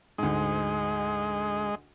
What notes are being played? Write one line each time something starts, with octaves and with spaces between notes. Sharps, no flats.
D2 G#2 G#3 D#5